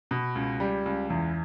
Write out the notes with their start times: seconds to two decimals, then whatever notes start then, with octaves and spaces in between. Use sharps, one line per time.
0.11 B2
0.35 C#2
0.60 G3
0.86 C#2
1.10 E2